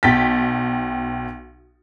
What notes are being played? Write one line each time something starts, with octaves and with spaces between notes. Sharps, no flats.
B1 G5 A6 B6